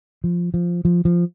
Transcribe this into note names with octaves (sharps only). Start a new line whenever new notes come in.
F3
F3
F3
F3